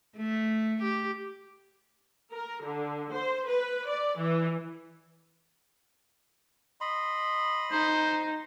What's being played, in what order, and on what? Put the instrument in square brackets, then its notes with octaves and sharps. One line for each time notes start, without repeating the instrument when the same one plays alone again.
[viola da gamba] A3
G4
[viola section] A#4
D3
C5
B4
D5
E3
[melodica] D#5 B5 C6
[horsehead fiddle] D#4 [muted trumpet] C5